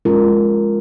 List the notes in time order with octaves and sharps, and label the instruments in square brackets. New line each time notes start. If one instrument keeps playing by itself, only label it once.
[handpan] G#3 C#4 F4 A#4